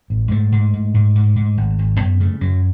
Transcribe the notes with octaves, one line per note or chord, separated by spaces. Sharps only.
A1
G#2 A3
G#2
G#2
G#2
G#2
G#2
G#1
G#1
F#2 B3
C#3 A3
F#2 F#3